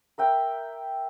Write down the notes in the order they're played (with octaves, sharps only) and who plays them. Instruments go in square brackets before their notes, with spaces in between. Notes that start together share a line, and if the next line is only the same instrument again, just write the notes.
[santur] A#4 E5 G5